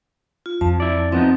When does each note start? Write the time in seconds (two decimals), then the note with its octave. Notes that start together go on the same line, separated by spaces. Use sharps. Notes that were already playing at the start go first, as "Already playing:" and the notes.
0.46 F4
0.61 F2 F3 A5
0.80 E4 D5
1.12 F3 B3 C4 D#4